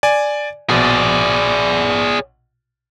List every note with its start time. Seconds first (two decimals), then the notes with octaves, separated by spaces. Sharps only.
0.03 D5 G#5
0.69 A#1 B2 G#4 D5